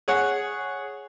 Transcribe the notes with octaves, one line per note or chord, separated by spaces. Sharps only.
G#4 C#5 F#5